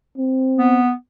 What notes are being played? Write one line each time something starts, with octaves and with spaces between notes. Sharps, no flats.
C4
B3